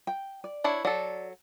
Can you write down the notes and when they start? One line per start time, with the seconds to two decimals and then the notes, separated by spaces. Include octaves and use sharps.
0.07 G5
0.44 D5
0.64 D4 E4 C#5
0.85 F#3 A4 D5